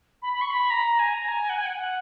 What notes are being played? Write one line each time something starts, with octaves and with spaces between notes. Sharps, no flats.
B5
B5
C#6
B5
A#5
G#5
A#5
G#5
F#5
G#5
F#5
F#5